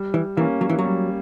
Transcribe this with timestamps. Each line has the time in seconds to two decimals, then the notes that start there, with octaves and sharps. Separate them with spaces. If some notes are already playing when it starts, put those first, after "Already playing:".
Already playing: G3
0.14 E3
0.37 E3 A#3
0.40 C#4
0.61 F#3
0.69 E3
0.79 F#3
0.84 G3